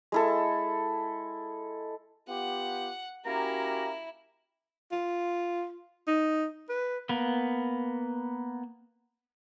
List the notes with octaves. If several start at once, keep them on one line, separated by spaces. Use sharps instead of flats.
G#3 E4 A4
B3 F4 G4 F#5
A#3 C#4 E4 F#4 G4 A#5
F4
D#4
B4
A#3 B3